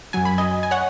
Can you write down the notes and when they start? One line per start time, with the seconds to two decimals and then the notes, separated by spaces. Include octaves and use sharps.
0.13 F#2 F#3 G#5
0.25 B5
0.38 D#5 G#5
0.63 G#5
0.71 C#5 F#5